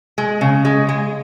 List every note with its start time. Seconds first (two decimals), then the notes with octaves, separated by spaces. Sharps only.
0.18 G#3
0.41 C#3
0.65 G#3
0.89 G#3